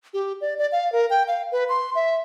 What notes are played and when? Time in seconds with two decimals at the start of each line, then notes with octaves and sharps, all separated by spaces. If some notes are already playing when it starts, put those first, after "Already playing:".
0.14 G4
0.41 D5
0.58 D5
0.72 F5
0.92 A#4
1.10 G5
1.28 F5
1.52 B4
1.69 C6
1.95 E5